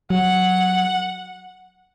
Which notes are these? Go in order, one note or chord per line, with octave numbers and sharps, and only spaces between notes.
F#3 F#5